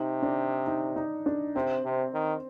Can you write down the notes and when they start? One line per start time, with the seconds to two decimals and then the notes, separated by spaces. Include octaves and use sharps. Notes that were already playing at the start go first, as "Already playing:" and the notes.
Already playing: C3 D#4
0.23 D4
0.67 D#4
0.96 D#4
1.26 D4
1.56 C3 C4
1.85 C3
2.14 D#3